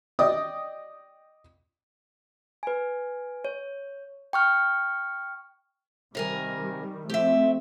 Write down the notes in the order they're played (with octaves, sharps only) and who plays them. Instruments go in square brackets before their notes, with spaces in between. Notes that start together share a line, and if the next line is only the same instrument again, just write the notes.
[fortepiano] D5 D#5 G5 D#6
[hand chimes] B4 G#5
C#5
G5 C#6 F6
[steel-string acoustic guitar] C3 A#4 G#5 [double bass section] D#3 G3
[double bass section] F3 A3 C4 [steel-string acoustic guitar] G4 E5